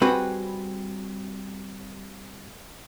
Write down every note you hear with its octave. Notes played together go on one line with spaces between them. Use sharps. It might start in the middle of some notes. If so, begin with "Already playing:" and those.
G3 C4 F#4 G#4 B4 F#5